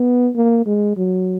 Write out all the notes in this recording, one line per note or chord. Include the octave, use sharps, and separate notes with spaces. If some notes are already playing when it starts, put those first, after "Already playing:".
Already playing: B3
A#3
G#3
F#3